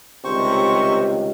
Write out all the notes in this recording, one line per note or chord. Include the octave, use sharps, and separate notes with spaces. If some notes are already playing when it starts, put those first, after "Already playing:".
C#2 C3 D#3 G3 C5 C#6